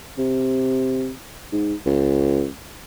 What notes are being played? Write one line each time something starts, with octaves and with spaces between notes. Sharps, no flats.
C3
G#2
C#2